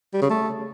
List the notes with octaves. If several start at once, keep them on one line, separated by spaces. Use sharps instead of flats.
G3
C#3
A3